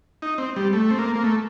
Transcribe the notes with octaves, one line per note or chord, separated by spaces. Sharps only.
D#4
C4
G3
A3
C4
A#3
A#3
A3